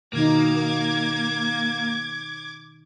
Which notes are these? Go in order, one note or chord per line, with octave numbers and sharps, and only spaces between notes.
B2 D#3 A#3 D#4 D6 G#6